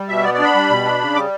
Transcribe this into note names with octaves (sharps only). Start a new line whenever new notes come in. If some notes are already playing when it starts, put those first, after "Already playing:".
Already playing: G3
B2 E5
B3 D5
D4 D5
B5
G3
B2
D4
C#3
G3 D6